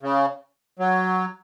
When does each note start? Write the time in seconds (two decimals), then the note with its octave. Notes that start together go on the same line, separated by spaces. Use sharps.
0.03 C#3
0.79 F#3